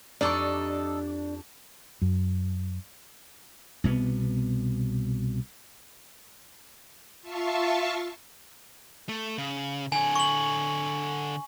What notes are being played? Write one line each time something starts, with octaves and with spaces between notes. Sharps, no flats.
F2 D4 D#4 G4 A4 D5 C#6 E6
F#2
C2 B2 B3
F4 E5 F5 A5 C#6
A3
C#3
D3 C#5 G#5
C#6 F#7